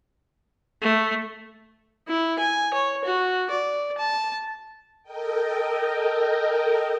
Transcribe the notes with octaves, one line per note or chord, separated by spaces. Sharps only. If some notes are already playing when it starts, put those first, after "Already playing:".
A3
E4
G#5
C#5
F#4
D5
A5
A4 A#4 D#5 G5